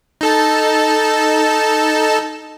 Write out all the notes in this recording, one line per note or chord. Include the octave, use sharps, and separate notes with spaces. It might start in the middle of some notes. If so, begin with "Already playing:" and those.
D#4 A4 A5